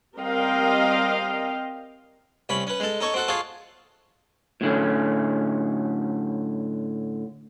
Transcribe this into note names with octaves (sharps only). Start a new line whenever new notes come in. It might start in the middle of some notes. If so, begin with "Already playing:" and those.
G3 C4 A#4 D#5 F5 G5
C2 C#4 B5
C#4 B4
G#3 A4
D#4 A4 C#5 C#6
C4 F#4 A4
F4 G#4 A4 C#5
A2 D3 C#4